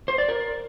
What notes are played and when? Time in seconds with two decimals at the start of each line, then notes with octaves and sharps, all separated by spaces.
0.08 C5
0.18 D5
0.29 A#4